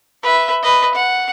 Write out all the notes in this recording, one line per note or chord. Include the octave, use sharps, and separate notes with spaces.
B4 E5
B4 D#5
F#5